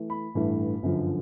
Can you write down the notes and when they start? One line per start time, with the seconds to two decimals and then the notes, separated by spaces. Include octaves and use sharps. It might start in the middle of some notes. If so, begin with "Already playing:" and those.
Already playing: E3 A3
0.10 B5
0.34 A1 G2 E3 A3
0.82 G1 F#2 D3 F3